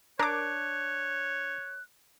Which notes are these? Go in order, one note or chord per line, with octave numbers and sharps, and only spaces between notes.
D4 A#4 C#5 D6 F#6